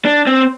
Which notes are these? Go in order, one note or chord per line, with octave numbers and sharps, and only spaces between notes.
D4
C4